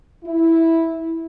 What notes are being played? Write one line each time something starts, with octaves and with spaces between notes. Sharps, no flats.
E4